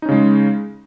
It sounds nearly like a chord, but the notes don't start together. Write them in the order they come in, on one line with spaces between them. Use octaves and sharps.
D#4 C#4 C#3 G#3